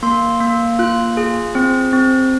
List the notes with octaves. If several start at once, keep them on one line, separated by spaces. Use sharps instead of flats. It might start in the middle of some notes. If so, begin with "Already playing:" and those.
A#3 C6
A#3
F4 F#6
G#4
C4
C4